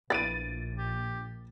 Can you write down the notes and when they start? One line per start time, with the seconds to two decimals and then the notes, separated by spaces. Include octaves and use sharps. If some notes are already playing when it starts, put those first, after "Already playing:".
0.10 A#1 E3 B4 A6 D7 D#7
0.78 G4